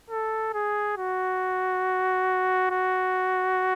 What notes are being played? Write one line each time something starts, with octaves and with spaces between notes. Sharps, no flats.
A4
G#4
F#4
F#4